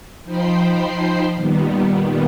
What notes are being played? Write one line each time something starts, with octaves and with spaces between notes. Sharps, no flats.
F3 D#4 C5 G5 B5 C7
A#2 D#3 G3 B3